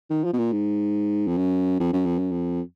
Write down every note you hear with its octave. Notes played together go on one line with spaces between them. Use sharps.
D#3
F3
B2
A#2
G#2
F2
F#2
F2
F#2
F2
F#2
F2